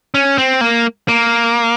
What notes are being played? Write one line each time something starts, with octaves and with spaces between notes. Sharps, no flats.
C#4
C4
A#3
A#3